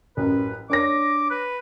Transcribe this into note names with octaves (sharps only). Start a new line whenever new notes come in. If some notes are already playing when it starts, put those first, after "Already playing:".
A1 F#2 B4
D4 C#5 D6 A#6
B4